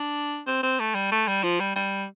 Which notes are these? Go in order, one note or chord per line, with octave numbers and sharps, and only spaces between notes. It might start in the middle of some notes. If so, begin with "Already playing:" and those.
Already playing: D4
C4
C4
A3
G3
A3
G3
F3
G3
G3